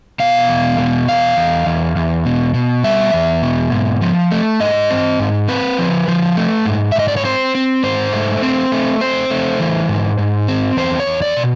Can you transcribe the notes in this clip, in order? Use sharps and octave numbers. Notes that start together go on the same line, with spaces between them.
B2 F5
E2
B2
E2 F5
E2
E2
E2
B2
B2
G3 E5
E2
B2
G#2
F3
A3
G#2 D#5
C4
G#2
C4 B4
F3
F3
A3
G#2
E5
G#2 D#5
D5
C#5
C4 C5
C4
G#2 C5
A3
C4
A3
C4 C5
A3
E3
G#2
G#2
C4
E2 C5
C#5
E2
D5
B2